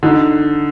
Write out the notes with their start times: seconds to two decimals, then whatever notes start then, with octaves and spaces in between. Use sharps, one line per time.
0.03 D3 D#4